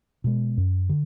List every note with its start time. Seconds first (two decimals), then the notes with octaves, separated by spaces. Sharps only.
0.24 B2 G#3
0.57 F#2
0.89 D3